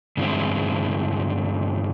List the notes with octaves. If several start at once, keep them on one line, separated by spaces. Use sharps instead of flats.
G2 D3 E3 G#3 C4 E4